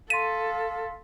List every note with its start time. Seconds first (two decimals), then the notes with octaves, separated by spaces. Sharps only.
0.10 A4 F5 C6 A6 B6 D#7